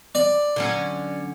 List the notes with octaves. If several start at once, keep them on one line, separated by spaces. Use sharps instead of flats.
D5
D3 F#3 C#4